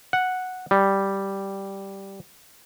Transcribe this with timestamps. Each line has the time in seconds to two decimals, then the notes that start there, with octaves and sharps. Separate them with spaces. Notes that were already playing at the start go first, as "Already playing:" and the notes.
0.13 F#5
0.71 G3